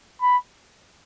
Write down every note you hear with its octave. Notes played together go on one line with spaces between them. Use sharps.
B5